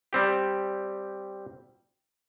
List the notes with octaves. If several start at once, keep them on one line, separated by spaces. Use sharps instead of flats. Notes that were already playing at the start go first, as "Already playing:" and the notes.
G3 C4 G4